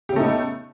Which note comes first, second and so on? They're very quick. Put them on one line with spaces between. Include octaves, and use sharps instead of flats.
G4 C#3 A3 D#4 B3